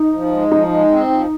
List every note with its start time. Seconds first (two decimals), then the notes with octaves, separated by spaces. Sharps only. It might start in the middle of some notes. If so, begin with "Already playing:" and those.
Already playing: D#4
0.13 F3
0.32 G#3
0.52 F3 D#4
0.71 G#3
0.91 C4
1.10 F3